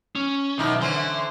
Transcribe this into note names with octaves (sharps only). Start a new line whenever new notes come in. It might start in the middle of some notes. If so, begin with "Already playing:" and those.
C#4
B1 D#3 D#4 E4
D3 E3 C#4 C5